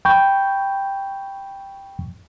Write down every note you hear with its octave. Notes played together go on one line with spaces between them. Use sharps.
G5 B5 C#6 G6